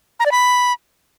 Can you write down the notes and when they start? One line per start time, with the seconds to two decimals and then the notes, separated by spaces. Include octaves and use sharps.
0.20 A#5
0.26 D5
0.32 B5